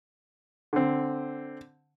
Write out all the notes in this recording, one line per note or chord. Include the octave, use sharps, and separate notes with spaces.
D3 C4